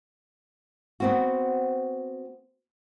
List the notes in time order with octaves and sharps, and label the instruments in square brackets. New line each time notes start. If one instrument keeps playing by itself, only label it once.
[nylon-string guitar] B3 C4 F#4